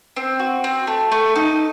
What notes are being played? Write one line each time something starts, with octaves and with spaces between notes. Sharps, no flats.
C4
F#4
C4
A3
A3
D#4